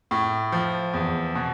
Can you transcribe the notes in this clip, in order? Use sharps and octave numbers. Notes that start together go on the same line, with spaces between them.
A2
F3
E2
B2